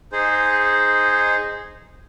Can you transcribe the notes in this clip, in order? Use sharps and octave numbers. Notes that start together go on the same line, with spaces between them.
D#4 G#4 C5